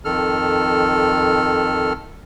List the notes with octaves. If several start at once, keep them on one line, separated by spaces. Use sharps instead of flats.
F2 D#3 A4 F6